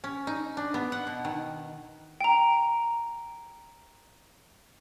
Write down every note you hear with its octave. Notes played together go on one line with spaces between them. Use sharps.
C#4
D#4
D4
B3
F#5
B2
D#3
G5 A#5